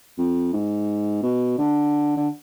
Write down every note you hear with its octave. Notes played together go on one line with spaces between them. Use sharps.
F2
G#2
B2
D3
D3